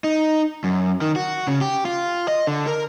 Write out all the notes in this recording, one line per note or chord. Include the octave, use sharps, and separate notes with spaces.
D#4
F#2
D#3
F#4
C#3
G4
F4
D#5
D3
A#4